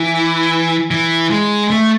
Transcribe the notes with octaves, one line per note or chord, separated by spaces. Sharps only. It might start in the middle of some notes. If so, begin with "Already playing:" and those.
Already playing: E3
E3
G#3
A3